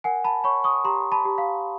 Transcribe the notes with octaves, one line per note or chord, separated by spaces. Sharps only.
A#4 F#5 G#5
A5 B5
C#5 B5 C#6
C#6 D#6
G4 A#5 C6
A5 B5
G4
F5